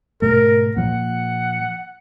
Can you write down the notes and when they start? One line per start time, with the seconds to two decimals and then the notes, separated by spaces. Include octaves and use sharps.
0.22 G#2 B2 A3 A#4
0.77 A#2 F3 A#3 F#5